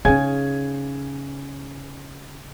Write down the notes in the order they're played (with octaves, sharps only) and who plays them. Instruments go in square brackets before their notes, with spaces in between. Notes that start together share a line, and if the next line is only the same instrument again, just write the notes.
[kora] C#3 [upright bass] C#4 D#4 [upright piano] G#5 G#6